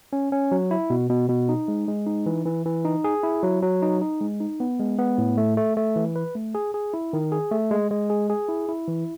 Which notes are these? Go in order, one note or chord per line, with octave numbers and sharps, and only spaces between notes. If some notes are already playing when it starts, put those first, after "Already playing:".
C#4
C#4
F#3
E4
B2
B2
B2
D#4
G#3
G#3
D#4
E3
E3
E3
D#4
G#4
E4
F#3
F#3
D#4
D#4
G#3
D#4
B3
G#3
B3
A2
A3
A3
A3
E3
B4
A3
G#4
G#4
E4
D#3
G#4
A3
G#3
G#3
G#4
G#4
E4
E4
E3